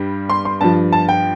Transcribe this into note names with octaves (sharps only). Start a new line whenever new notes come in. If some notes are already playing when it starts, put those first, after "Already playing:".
Already playing: G2 G3
C6
C6
G2 F3 A5
A5
G5